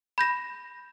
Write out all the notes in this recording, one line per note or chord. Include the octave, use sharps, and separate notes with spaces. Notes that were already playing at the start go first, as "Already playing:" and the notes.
B5 G6 A#6 E7